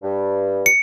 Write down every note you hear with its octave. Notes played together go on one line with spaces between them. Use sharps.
G2
C#7